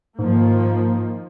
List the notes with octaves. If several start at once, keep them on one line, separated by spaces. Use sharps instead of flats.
G#2 D#3 F3 A#3